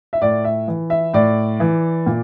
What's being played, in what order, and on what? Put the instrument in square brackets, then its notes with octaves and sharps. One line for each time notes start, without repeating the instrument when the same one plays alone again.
[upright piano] E5
A2 D5
E5
E3
E5
A2 D5
E3
A#2